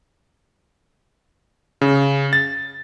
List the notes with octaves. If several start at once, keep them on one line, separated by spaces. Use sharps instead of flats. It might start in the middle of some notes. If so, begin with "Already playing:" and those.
C#3
A6